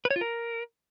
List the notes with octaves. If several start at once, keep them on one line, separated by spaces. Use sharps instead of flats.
B4
C#5
F4
A#4